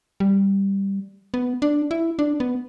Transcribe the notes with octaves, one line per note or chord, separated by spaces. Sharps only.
G3
B3
D4
E4
D4
B3